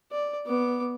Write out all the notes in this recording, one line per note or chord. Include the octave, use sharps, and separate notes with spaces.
D5
B3 D6